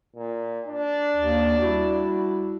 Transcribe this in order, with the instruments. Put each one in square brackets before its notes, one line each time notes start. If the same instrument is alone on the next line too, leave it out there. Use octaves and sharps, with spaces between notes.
[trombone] A#2
D4
[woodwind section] D#2
G3 E4 F#4